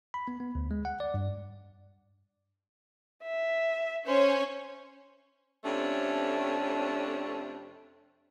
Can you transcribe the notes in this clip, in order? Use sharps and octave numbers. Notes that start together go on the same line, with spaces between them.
B5
B3
B3
D2
G#3
F#5
D5
G2
E5
C#4 C5 C#5
F2 C3 A3 C#4 D4